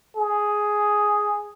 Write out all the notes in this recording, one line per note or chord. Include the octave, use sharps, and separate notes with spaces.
G#4